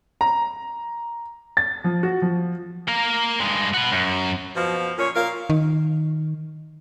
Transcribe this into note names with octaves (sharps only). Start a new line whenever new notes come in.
A#5
A6
F3
F#4
F3
A#3 A#4
G2 G#3
F#4 B4
F#2
B2 F3
A#2 C#4 C#5
A#2 A#4 F5
D#3